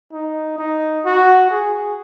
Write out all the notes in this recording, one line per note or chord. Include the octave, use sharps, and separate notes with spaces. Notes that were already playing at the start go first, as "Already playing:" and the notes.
D#4
D#4
F#4
G#4